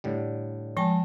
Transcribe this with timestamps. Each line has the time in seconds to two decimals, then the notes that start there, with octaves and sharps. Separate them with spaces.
0.04 A2 D3 G3
0.77 F3 G#3 G5 A5